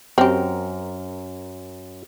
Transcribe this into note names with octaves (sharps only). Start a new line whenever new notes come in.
F#2 C4 G4 A#4